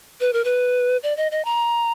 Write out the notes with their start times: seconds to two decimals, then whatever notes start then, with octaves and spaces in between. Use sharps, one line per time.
0.20 B4
0.33 A#4
0.45 B4
1.03 D5
1.17 D#5
1.32 D#5
1.45 A#5